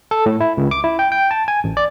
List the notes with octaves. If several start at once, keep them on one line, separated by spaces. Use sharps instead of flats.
A4
A2
E4
C#2
D6
E4
G5
G5
A5
G#5
A1
D5